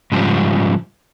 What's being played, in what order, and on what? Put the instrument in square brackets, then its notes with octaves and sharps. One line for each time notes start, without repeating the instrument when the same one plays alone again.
[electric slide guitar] G#2 C#3 F3 G3